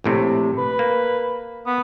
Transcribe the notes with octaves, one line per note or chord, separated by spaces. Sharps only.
A#1 A2 C3
B4
A#3
B3